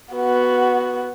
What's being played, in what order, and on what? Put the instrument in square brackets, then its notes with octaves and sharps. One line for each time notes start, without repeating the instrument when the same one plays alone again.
[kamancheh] B3 F#4